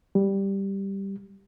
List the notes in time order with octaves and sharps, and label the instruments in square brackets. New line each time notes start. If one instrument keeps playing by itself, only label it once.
[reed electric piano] G3